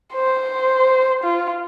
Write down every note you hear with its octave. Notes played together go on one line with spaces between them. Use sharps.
C5
F4